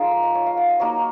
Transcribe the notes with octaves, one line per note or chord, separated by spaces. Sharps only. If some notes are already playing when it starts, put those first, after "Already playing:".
Already playing: F3 G#3 D#4 F4
A#4
D#5
C#5
F5
F#5
D#5
F#3 A#3 D#4 C#5